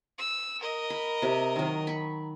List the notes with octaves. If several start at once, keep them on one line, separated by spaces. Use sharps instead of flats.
E6
A#4 D#5
B5
C3 G4
D#3 F#3
B5 C#6